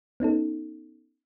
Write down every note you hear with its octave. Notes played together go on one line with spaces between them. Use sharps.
B3 C#4 D#4 A4